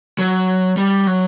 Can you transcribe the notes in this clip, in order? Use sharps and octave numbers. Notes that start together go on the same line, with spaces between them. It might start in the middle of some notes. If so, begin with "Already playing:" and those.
F#3
G3
F#3